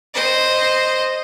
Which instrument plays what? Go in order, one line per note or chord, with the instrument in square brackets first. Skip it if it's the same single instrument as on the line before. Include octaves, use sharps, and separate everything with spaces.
[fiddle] C5 D#5